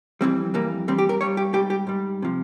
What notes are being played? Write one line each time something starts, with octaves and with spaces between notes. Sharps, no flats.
F2 E3 G3 C4
F2 E3 G3 A#3
G2 G3 C4
G4
A#4
G2 G3 C#5
G4
G#2 G3 G4
G4
G#2 G3
C3 F3